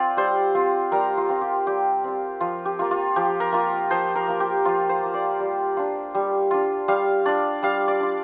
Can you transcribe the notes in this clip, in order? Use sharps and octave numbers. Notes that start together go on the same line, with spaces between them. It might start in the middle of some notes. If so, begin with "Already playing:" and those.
Already playing: C4 F4 D5
G3 C5
C4 F4
G3 A#4
F4
C4 F4
G4
G3 G4
C4 F4
F3 F4
G4
A#3 F4
F4
F3 G4
A#4
A#3 F4
F3 C5
A#4
A#3 F4
G4
F3 F4
C5
A#3 F4
D5
G3
D4 F4
G3
D4 F4
G3 F5
D4 F4 D5
G3 F5
D5
D4 F4